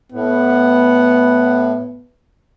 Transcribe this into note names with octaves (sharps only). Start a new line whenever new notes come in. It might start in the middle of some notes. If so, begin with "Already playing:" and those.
A2 B3 F#5